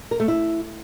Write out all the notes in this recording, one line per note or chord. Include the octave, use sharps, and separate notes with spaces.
A#4
A3
E4